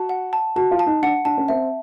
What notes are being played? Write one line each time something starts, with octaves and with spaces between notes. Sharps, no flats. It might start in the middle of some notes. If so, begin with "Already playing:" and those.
Already playing: F#4 A5
F#5
A5
F#4 A5
F4
A5
D#4
D4 F#5
D4 A5
C#4
C4 E5